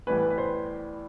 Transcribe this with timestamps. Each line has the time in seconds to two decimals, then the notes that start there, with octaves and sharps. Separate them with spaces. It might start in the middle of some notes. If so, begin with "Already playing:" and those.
0.07 A2 E3 G3 B3 B4
0.30 B4
0.38 C5